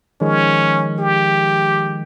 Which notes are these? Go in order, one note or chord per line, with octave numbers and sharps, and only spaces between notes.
D#3 F3 G#3 C#4
G4